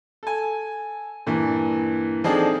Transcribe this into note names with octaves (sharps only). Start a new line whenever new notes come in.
A4 G#5
G2 A#2 E3
F3 C4 D4 D#4 G#4 A4